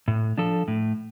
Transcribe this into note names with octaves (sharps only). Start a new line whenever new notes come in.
A2
F3 D4 A4
A2